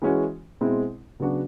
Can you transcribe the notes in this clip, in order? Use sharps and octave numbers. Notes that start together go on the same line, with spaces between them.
E3 G#3 C#4 F#4
B2 G#3 C4 E4
C#3 F#3 B3 D4 F#4